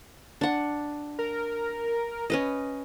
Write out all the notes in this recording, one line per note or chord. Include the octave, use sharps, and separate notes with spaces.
D4 F#5
A#4
C#4 B4 D#5